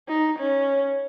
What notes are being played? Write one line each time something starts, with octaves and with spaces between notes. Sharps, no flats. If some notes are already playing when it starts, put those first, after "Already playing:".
D#4
C#4